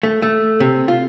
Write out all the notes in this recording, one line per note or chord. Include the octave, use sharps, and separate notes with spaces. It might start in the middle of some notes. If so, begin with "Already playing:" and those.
A3
A3
C3
F4